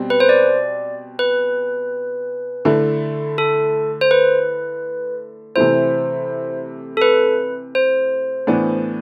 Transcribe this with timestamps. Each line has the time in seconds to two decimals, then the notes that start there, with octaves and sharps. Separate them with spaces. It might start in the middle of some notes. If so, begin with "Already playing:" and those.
Already playing: B2 G3 C4
0.10 B4
0.20 C5
0.29 D5
1.19 B4
2.65 D3 A3 E4
3.38 A4
4.01 C5
4.11 B4
5.56 C3 E3 A3 E4 C5
6.97 A4
7.02 B4
7.75 C5
8.47 A2 E3 B3 D4